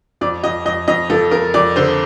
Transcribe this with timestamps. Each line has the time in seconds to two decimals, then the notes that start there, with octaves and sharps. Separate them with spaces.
0.21 F2 D5
0.43 F2 D#5
0.65 F2 D#5
0.88 F2 D#5
1.10 F3 A4
1.31 F2 A#4
1.54 F2 D5
1.76 D3 C5